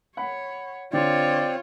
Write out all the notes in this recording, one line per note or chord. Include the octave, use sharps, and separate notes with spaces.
C#5 F#5 B5
D3 C4 F4 C#5 D5